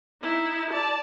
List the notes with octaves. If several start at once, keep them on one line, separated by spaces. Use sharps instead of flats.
D#4 E4
D5 A5